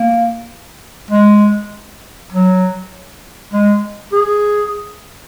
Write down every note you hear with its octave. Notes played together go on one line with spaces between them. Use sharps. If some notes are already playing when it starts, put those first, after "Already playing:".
Already playing: A#3
G#3
F#3
G#3
G#4